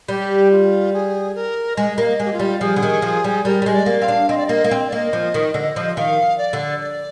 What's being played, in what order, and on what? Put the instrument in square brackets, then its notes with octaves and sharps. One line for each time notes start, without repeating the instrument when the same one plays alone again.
[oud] G3 [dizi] G4
[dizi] F4
G#4
A#4
[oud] G#3 [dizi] D#5
[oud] A#3
[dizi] D#5
[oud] G#3
[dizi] G4
F4
[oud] G3
[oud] F3 [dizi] G#4
[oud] D3
D#3
F3
G3
[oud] G3 [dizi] A#4
[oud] G3
G#3
[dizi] D5
[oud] A#3
[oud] C4 [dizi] F5
[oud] D4
[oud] C4 [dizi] D#5
[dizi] D5
[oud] A#3 [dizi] D#5
[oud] A#3
[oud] C4 [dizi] F5
[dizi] D#5
D5
[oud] A#3 [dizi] D#5
[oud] F3
D#3
D3
F3
[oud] D#3 [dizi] F5
[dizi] D5
[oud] D3
[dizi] D5